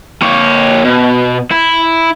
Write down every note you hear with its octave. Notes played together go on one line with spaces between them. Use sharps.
A#3 C#5
B2
E4